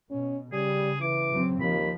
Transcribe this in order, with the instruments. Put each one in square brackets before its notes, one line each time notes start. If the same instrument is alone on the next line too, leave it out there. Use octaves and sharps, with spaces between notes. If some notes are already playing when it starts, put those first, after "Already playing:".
[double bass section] B2 [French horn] C#4
[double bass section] C#3 [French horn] G3 [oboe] G#4
[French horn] E3 [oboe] D6
[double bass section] C#3 F#3 C4
[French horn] D#2 [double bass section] F3 [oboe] B5